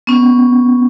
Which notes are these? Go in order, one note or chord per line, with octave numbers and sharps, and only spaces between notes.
B3 C#4